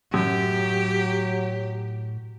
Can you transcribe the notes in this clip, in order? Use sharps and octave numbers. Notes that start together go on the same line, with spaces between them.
F#2 A2 F#3 G4